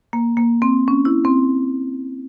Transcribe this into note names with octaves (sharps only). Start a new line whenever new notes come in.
A#3
A#3
C4
C#4
E4
C4